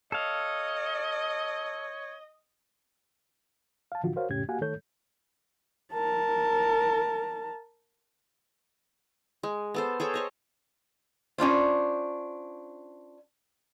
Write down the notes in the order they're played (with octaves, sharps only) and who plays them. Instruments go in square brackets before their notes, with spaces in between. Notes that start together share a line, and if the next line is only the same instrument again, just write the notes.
[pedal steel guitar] A4 F5 [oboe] C#5 [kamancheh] D#5
[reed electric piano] F5 A5
A2 D3 E3 F3 F4 F#4
F#4 A#4 C5 C#5 F5
F2 A2 C#3 C#4 G4 G#6
A#3 F#4 G4 F5 F#5 G#5
D#3 A3 A4 C#5 G6
[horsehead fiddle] A#4 A5
[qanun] G#3
B3 A4 C5
G#4 A4 C#5 G5
C5 C#5 D#5
[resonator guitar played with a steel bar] C#4 D4 F4 C5